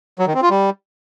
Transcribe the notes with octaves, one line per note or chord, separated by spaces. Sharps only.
F#3
D#3
C4
F4
G3